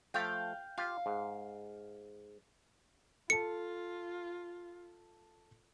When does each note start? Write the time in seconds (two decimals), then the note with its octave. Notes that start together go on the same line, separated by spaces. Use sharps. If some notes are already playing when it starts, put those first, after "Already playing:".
0.14 F3 A3 F5 G5
0.78 F4 G4 F5
1.06 G#2
3.30 F4 A4 A5 C#7